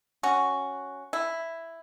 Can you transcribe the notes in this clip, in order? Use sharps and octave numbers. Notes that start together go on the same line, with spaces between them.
C#4 F#4
E4